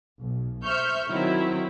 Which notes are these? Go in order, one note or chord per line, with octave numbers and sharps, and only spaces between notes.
B1
C5 E5 C#6 F6 G6
D#3 F#3 C4 E4